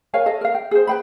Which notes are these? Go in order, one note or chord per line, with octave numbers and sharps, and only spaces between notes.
A#4 C#5 F5 G#5
A4 D#5
A#4 F5
G5
G#4 C5
B4 G5 B5